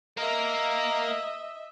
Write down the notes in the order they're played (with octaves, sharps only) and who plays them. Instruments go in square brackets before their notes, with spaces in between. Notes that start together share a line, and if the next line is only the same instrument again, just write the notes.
[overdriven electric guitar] A#3 A#4 [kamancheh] D#5 E5